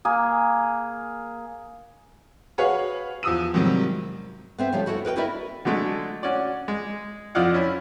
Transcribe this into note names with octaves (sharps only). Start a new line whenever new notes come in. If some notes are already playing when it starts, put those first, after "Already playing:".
A#3 G#4
F#4 G#4 B4 C#5 F5 F#5
E2 F3 D#6 E6 D#7
G#2 C3 D#3 F#3 G3
B3 C4 E5
C#3 F3 G3 A3 G4
E4 F#4 A4 C5 C#5
A#4 B4 D5 G5
E4 F#4 A#4 B4 D5 E5
D3 F#3 G#3 A3
C#4 F#4 D5
G#3
F2 F3 D5 D#5 F5 F#5
C#4 E4